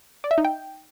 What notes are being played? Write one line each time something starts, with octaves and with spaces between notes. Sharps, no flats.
D5
E5
D#4
G5